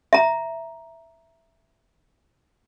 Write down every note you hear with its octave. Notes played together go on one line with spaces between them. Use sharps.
E5 A#5